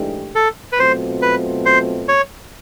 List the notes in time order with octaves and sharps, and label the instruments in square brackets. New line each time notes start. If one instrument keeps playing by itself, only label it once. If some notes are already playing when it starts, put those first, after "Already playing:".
Already playing: [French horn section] G#2 E3 A3 D4 G4
[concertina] A4
B4
[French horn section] B2 F#3 A3 C4 F4 [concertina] C5
[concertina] B4
C5
C#5